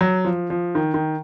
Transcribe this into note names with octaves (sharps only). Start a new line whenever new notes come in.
F#3
F3
F3
D#3
D#3